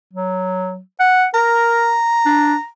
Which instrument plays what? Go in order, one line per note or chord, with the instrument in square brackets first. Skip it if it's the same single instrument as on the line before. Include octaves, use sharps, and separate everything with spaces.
[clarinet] F#3
F#5
[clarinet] A#4 [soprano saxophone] A#5
[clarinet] D4